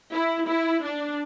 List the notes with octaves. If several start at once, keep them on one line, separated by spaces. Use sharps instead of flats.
E4
E4
D4